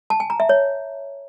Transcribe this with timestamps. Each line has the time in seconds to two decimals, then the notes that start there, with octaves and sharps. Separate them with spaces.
0.10 A5
0.20 G#5
0.30 A#5
0.40 E5
0.49 C#5